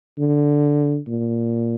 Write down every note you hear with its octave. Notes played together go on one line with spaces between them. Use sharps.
D3
A#2